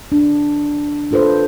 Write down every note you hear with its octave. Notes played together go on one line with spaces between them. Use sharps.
D4
D4 F4 A4 B4 C5